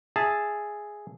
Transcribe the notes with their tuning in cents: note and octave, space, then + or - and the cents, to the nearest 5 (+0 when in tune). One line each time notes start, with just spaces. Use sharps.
G#4 +0 E5 +0 A5 +0